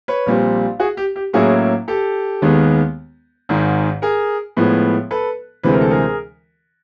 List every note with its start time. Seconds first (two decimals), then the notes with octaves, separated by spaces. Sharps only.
0.08 B4 C#5
0.26 A#1 A#2 G3 C4
0.80 F#4 G#4
0.97 G4
1.16 G4
1.33 A2 F#3 A#3 C#4 E4 F#4 G#4
1.88 G4 A4
2.42 D#2 D#3 G#3 B3
3.49 G#1 G#2 D#3
4.02 G#4 A#4
4.57 A2 F3 G#3 B3
5.11 A4 B4
5.63 D2 C3 E3 G#3 C4 B4
5.73 A#4
5.81 A4
5.90 G#4 A#4